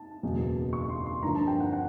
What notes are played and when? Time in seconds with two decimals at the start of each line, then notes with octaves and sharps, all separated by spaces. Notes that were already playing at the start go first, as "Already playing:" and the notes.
Already playing: A5
0.23 F#1 E2 B2
0.73 C#6
0.89 C6
1.06 C6
1.23 G2 D3 F3 A#3 A#5
1.35 A5
1.47 G5
1.60 F#5
1.73 F#5